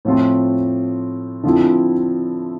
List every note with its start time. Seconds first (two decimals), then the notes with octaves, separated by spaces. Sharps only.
0.05 A2 F3 C4 F4
1.43 D3 F3 C4 E4